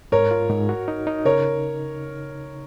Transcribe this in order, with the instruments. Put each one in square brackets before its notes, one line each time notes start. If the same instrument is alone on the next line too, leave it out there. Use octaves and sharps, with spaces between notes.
[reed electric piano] G#2 [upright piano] A#4 C#5
[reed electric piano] F4
G#2
F#4
D#4
D#4
[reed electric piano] C#3 [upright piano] A#4 C#5